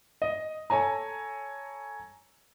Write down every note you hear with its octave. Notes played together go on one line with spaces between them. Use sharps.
D#5
A4 C#5 G#5 A#5